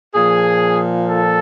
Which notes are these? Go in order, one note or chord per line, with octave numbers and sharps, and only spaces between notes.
A#2 F3 G#4
A4